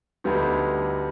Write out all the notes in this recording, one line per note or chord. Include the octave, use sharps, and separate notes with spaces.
D2 D3 G3 B3 D#4